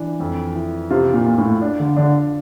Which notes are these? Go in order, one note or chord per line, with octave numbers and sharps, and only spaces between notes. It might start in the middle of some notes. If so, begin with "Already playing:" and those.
Already playing: E3 D4
F2
E3
C3 F4
A#2
F4
A2
D4
D3
D3 D4